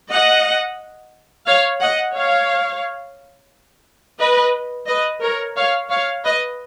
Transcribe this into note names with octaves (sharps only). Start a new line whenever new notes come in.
D#5 F#5
C#5 F5
D#5 F#5
C#5 F5
B4 D#5
B4 D#5
A#4 C#5
C#5 F5
C#5 F5
B4 D#5